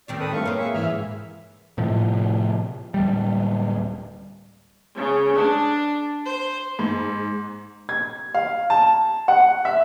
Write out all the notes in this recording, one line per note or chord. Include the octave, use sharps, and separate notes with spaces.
D#2 D#3 C4 D5
A4 B4 D#6
G2 A3 F5 C#6
A#3 C4 C#4 B4 F5
G#4 E5 C#6
G#2 E3 E5 F6
A2 C3 F3
D1 G3
C#3
D4
C5
G#2
G#6
F5
A5
F#5
E5